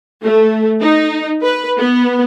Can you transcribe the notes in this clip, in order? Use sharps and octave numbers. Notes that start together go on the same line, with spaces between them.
A3
D#4
B4
B3